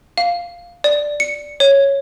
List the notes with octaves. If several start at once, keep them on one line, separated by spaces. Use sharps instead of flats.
F5
D5
C#7
C#5